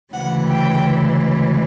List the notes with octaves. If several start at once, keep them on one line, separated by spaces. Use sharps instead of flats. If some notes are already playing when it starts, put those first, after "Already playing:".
D2 C#3 E3 G#3 F#5
G5